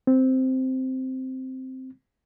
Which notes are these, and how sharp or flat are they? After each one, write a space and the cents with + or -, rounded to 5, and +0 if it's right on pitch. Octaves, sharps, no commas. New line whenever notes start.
C4 -5